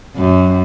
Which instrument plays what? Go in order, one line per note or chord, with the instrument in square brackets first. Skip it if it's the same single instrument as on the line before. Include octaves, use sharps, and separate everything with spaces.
[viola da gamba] F#2